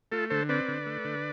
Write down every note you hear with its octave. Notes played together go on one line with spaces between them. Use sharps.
A3 F4 A4
D3 A4 C5
C4 B4 D5
D3
A3
D3